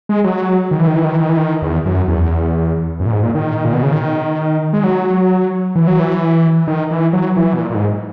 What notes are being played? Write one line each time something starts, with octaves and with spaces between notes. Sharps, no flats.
G#3
F#3
D#3
E3
D#3
E3
D#3
E3
D#3
E3
D#3
E2
F#2
E2
F#2
A#2
G#2
A#2
D#3
A#2
B2
C#3
D#3
G#3
F#3
E3
F#3
E3
D#3
E3
F#3
E3
B2
A#2
A#2
G#2